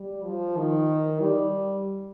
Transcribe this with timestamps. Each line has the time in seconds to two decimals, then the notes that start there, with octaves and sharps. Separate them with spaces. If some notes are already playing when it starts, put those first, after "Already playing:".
Already playing: G3
0.25 F3
0.57 D#3
1.21 G3